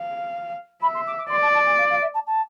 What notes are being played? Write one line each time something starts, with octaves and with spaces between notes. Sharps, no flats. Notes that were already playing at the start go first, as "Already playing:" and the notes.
Already playing: F5
E5 B5
C6
D6
D6
D5 C6
A5
A5
G#5
F5
F5
E5
A5
A5